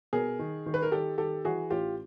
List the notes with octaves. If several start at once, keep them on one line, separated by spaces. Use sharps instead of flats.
B2 G#4 A#4
D#3
D#3
B4
A#4
D#3 G4 A4
D#3 G4 A4
E3 F#4 G#4
A1 F4 G4